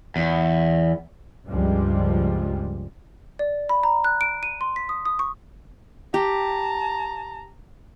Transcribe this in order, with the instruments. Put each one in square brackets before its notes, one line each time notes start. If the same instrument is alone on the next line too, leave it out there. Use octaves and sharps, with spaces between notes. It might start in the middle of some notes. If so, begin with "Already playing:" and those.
[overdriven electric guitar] E2
[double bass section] C#2 G2 F3 G3 G#3
[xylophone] D5
B5
A#5
F#6
D7
D#7
C6
B6
D#6
D#6
C#6
[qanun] G4 [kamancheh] A5 A#5